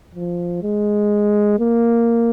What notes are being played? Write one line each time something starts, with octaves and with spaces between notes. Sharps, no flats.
F3
G#3
A#3